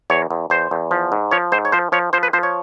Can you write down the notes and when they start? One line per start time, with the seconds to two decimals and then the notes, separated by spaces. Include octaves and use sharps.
0.10 E2 C#5
0.31 E2
0.50 E2 C5
0.71 E2
0.91 F3
1.12 G#2
1.31 F3 C#5
1.52 G#2 C5
1.65 C#5
1.72 F3 C5
1.92 F3 C#5
2.13 F3 C5
2.23 B4
2.33 F3 C5
2.43 C#5